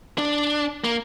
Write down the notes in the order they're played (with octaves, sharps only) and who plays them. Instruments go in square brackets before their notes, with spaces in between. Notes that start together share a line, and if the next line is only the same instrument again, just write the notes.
[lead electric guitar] D4
A#3